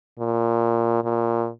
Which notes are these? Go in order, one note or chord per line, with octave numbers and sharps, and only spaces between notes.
A#2
A#2